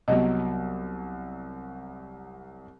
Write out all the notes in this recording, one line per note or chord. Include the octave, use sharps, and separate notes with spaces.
C2 F#3 B3 D#5